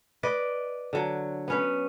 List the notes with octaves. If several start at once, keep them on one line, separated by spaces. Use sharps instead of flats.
B4 D5 D#5
D3 F#3
B3 C#4 B4